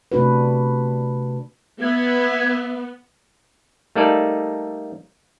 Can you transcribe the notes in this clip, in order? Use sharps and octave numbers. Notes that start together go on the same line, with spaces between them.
C3 A3 D4 F#4 B4
B3 E5 G#6
G3 A3 A#3 D#4 A4 D5